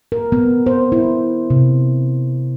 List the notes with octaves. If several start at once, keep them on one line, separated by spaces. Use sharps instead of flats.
A#4
B3
C5
E4
C3